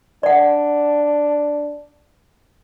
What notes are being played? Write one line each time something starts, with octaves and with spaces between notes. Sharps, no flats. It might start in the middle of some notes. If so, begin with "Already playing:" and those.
D4 D5 F#5